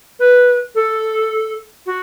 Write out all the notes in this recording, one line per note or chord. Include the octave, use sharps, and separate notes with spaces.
B4
A4
F#4